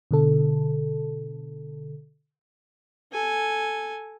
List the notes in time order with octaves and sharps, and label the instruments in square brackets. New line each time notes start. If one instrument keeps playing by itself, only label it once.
[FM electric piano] B2 D3 A4
[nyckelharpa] A4 G#5